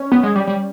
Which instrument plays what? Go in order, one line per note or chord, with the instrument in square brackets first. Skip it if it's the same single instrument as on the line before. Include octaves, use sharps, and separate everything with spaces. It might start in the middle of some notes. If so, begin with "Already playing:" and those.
Already playing: [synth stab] C#4
[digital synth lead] B3
G#3
G3
G3